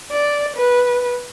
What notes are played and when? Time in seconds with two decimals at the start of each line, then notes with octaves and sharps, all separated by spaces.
0.12 D5
0.56 B4